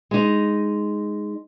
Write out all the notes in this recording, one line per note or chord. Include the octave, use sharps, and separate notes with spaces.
G#3 D#4